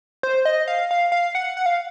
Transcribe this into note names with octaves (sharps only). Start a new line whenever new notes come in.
C5
D#5
F5
F5
F5
F#5
F#5
F5